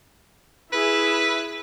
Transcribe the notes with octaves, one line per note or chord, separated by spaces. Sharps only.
E4 G#4 B4